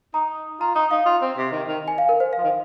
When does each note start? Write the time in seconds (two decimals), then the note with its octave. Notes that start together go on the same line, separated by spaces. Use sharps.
0.14 D#4 A#5
0.60 F4 A#5
0.75 D#4 A#5
0.91 D#4 F5
1.06 F4
1.22 C4
1.37 C3
1.52 D#3
1.68 D#3
1.88 G#5
1.98 F5
2.09 A#4
2.20 C5
2.33 F5
2.38 F3
2.44 D#3